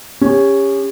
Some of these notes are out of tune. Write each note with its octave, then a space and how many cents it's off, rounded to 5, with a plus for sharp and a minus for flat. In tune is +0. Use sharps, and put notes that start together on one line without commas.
C#4 +0 G4 +35